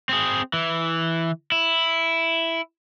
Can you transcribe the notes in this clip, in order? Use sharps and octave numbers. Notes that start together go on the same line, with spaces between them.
C4 G#4
E3
E4